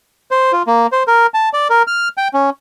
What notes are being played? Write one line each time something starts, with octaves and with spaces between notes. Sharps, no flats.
C5
F4
A#3
C5
A#4
A5
D5
A#4
F6
G5
C#4